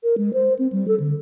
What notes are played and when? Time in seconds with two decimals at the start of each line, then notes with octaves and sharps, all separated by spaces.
0.03 A#4
0.18 G#3
0.34 C5
0.59 C4
0.72 G3
0.88 A4
1.00 D3